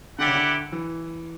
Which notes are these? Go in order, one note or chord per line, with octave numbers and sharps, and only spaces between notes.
D3 E4 G4 D5 F#5
C#3
D3
E3